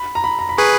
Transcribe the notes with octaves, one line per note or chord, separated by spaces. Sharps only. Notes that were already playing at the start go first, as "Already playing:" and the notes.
Already playing: B5
A#5
B5
A#5
B5
G#4 B4 C#6